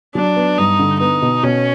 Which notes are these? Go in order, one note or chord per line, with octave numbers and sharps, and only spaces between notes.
F#3 D4
B3
G2 D#4
D3
B3 D#4
B2
B2 C#4